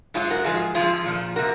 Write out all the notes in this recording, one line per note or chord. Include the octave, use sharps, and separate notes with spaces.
G#2 F#3 F4 G#4
F#4 A#4
G#2 F3 F4 G#4
F2 C#3 F3 F4 G#4
A#2 F3
C3 F#4 A#4